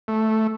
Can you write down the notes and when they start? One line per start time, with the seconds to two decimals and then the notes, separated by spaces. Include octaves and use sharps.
0.08 A3